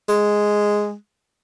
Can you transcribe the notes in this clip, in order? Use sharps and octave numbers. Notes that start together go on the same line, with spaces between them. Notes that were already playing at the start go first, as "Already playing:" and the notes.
G#3